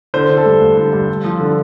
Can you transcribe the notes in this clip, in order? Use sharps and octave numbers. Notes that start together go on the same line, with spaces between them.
D3 C5
D3
A4
G2
G2
D3
G2
G2
F3
D3